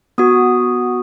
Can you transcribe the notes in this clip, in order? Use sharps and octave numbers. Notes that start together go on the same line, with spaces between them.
B3 F#4 D#6